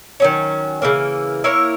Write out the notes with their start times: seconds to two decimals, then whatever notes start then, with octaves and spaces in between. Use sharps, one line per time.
0.20 D#3 F#3 C#4
0.82 C#3 E3 A#3
1.44 A#3 E4 A#4 C#5